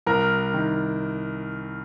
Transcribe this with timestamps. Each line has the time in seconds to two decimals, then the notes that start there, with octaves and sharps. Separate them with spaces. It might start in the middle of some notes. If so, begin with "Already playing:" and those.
0.07 C2 A#4
0.54 D#3